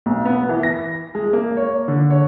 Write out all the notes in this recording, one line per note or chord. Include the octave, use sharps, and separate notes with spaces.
B1
B3
E3
A#6
G#3
A#3
C#5
D3
C#5